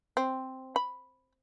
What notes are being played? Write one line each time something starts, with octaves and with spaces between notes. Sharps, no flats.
C4
B5